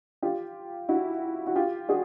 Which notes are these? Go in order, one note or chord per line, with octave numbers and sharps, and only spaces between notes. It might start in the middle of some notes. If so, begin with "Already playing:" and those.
F4 G4
E4 F#4
F#4
F4 G4
F#4 G#4